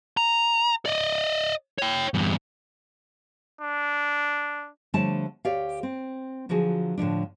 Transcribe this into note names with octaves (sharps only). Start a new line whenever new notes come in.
A#5
D5 D#5
C#5 G5
E2 G2
D4
D3 F3 G3 A3 C#5 A5
D2 G4 C#5 D5 F5
C4
D3 F3 F#3 F#4 G#4
A2 D3 F3 D4